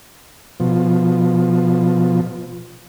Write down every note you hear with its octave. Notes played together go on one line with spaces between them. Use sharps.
B2 F3